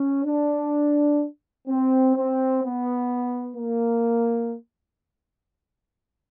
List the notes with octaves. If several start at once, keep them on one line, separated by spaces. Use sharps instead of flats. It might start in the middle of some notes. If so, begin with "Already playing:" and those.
Already playing: C#4
D4
C4
C4
B3
A#3